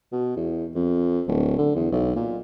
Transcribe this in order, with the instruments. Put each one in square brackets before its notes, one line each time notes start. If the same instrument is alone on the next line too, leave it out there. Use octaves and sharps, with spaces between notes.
[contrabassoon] B2
E2
F2
D1
D3
E2
B1
A#2